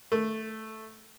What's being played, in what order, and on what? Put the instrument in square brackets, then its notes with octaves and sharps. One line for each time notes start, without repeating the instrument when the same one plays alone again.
[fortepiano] A3